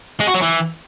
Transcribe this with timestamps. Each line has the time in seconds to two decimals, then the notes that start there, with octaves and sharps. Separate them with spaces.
0.20 G#3
0.27 F#4
0.34 F#3
0.41 E3